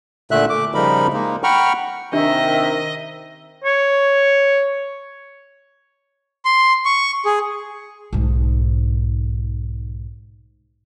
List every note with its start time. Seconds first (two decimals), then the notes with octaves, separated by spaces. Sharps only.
0.31 A#2 D3 A3 E5 F#6
0.49 A3 D6
0.74 C#3 F3 G3 D#4 A#4 B5
1.13 G#3 A#3 D#4
1.44 F#5 G5 A#5 B5 C#6 F6
2.13 C3 D#3 D4 G4 D#5 E5
3.64 C#5
6.45 C6
6.85 C#6
7.26 G#4
8.13 B1 G#2